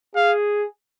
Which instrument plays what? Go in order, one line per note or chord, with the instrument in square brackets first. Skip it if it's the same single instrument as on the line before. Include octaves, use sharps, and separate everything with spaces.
[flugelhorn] G#4 [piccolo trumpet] F5